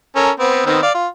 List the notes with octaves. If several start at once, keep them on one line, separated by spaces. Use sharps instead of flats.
C#4 A4 A#4
B3 C4
D#3 B3 C4
D5 F5
F4